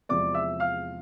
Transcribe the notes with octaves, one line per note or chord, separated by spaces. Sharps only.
E2 C3 F3 G#3 D5 D6
E5 E6
F5 F6